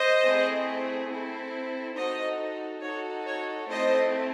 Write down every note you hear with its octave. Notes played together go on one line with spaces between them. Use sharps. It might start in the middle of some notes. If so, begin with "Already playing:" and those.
Already playing: C5 D#5
A3 C4 E4 G#4
C4 E4 A4
D#4 F#4 A4 C5 D#5
D#4 F#4 A4 C#5
C#5
A3 C4 E4 C5 D#5